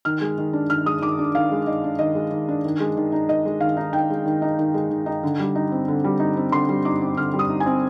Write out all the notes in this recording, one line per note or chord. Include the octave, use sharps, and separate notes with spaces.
D#3 F6
G#3
D#3
D4
D#3 F6
G#3 D#6
D#3 D6
D4
D#3 F5
G#3
D#3 D#5
D4
D#3 D#5
G#3
D#3
D4
D#3
G#3
D#3
D#4
D#3 D#5
G#3
D#3 F5
D#4
D#3 G5
G#3
D#3
D#4
D#3
G#3
D#3
D#4
D3
G3
D#4
C4
D3
G3
D#4
C4
D3 C6
G3
D#4 D6
C4
D3 F6
G3
D#6
D#4
G#5
C4